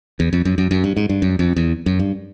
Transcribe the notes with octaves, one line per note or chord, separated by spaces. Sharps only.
E2
F2
F#2
F#2
F#2
G2
G#2
G2
F#2
F2
E2
F#2
G2